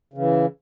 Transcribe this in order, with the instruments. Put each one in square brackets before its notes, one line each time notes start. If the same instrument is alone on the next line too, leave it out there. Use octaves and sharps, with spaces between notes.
[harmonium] C#3 E3